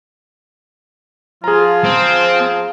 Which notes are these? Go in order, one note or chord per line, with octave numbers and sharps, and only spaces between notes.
F3 F4 G#4 A#5
C4